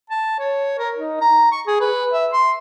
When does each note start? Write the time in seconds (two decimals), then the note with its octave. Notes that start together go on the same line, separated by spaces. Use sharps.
0.10 A5
0.39 C#5
0.78 A#4
0.96 D#4
1.21 A#5
1.52 C#6
1.67 G#4
1.80 B4
2.13 E5
2.33 C6